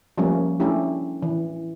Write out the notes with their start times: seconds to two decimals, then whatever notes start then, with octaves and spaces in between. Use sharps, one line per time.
0.18 F3 G3 A3 A#3 C#4
0.60 A3 C#4 D4 E4 G4
1.22 E3